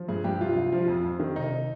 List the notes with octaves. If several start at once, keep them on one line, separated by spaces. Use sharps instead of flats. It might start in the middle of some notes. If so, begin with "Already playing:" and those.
Already playing: F3
G2 G#4
G2 G4
C2 F4
C2
F3
F2
F2
D#3
F1 D#4